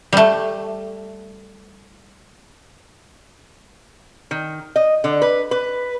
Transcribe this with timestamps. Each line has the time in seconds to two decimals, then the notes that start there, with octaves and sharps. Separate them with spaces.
0.13 G3 A3
4.31 D#3
4.76 D#5
5.04 D3
5.22 B4
5.51 B4